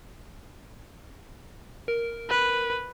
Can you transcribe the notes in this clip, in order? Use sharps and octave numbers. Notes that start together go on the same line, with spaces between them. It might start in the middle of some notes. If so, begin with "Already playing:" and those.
A#4
B4